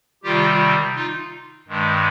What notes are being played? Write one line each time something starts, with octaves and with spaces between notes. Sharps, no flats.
C3 D#3 G3 F4 G4
D#4 F4
G2 D#3 G#3